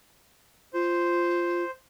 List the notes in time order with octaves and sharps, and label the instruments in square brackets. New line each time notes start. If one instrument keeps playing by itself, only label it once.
[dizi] F4 [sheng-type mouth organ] C5